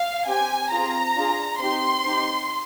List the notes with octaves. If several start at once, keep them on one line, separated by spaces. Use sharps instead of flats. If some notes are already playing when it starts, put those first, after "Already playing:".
Already playing: F5
C4 G4 G#5
C4 F4 G#4 A#5
D4 F4 G#4
C4 D#4 G4 C6
C4 D#4 G4